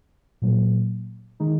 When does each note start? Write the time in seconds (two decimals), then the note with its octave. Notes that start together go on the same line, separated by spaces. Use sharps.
0.42 A#2 F#3 A#3
1.40 D#3 G#3 D#4